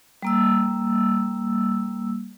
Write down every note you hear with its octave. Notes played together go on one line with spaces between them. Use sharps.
G3 A#3 E6